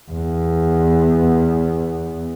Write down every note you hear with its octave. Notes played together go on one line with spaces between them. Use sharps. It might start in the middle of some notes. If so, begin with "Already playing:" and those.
E2 B3